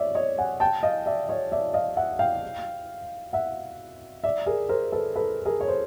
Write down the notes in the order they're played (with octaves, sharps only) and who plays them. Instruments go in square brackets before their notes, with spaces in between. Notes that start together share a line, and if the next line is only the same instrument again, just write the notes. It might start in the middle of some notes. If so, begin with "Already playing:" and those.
Already playing: [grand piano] C#5 D5 E5
C#5 D#5
F#5 G#5
G5 A5
D#5 F5
D5 E5
C#5 D#5
D5 E5
D#5 F5
E5 F#5
F5 G5
E5 F#5
D5 E5
G#4 A#4
A#4 C5
A4 B4
A4 B4
G#4 A#4
C#5
C5